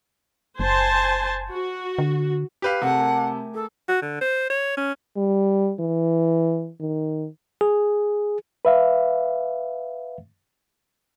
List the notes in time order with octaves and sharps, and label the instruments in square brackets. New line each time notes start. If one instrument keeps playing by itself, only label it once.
[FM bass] F#1 [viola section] C5 G#5 A5
[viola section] F#4
[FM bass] D3
[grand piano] G4 B4 F5
[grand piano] C3 [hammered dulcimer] A3 G#4 A#4 [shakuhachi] F#5
[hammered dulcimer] A3 G4 G#5
[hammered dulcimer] G#4 [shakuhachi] A4
[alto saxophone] F#4
D3
C5
C#5
C#4
[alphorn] G3
E3
D#3
[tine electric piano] G#4
[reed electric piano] B4 E5 F5